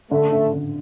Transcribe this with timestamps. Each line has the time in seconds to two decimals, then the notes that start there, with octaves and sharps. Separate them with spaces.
0.11 D3 A3
0.32 D3
0.53 D3